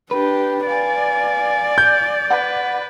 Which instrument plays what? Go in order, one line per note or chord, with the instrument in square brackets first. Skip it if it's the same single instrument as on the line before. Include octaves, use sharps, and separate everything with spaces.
[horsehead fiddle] D4 G4 [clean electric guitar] B4
[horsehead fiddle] D5 [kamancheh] F5 G#5
[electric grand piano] G6
[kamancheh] B4 [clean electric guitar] F#5